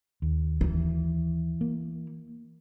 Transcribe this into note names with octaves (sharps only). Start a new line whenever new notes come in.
D#2
E3
A#3